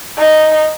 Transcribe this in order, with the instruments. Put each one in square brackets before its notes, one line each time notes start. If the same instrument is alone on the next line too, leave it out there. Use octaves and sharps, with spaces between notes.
[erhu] D#4